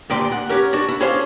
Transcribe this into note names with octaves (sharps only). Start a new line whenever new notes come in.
D2 A#2 G4 D5 C6
F#5
C#4 G4 A#4
D4 F#4
E4
C#4 D4 G#4 A4 C5 F5